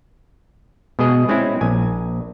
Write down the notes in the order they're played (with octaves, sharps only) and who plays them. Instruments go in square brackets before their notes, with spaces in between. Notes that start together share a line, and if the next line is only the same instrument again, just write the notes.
[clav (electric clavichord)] B2 G#3 G#4 D#5
G#3 C4 C#4 E4
A#1 G#5